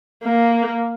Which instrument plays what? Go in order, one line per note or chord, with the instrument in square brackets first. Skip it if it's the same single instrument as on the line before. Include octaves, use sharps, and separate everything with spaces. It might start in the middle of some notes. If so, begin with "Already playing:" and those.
[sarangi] A#3